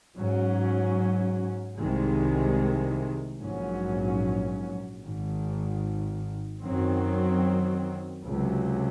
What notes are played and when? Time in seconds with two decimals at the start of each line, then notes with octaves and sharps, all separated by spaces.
0.16 G#2 F#3 C#4
1.78 C2 C3 D#3 G#3
3.40 A#1 G#2 F#3 C#4
5.02 G#1 G#2 D#3
6.63 F#2 D#3 F#3 C4
8.25 C#2 C3 F#3